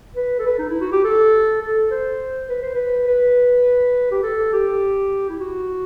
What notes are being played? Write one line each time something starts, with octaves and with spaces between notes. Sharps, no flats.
B4
A4
B4
D#4
E4
F#4
G4
A4
A4
C5
B4
C5
B4
B4
G4
A4
G4
E4
F#4